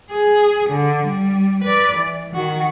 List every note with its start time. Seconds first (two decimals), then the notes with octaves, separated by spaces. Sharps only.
0.11 G#4
0.70 D3
1.06 G3
1.64 B4 D5
1.96 E3
2.34 D#3 F#4